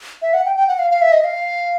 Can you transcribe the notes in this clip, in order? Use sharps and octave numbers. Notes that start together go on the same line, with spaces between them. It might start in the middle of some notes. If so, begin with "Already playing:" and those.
E5
F#5
G5
G5
F#5
F5
F5
E5
D#5
F5